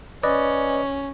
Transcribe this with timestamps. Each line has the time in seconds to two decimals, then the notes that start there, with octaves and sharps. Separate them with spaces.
0.23 C#4 B4 D5 D#5